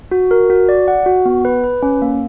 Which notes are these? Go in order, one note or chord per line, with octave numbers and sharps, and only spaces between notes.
F#4
A#4
F#4
D5
F#5
F#4
B3
B4
B4
C#4
A#3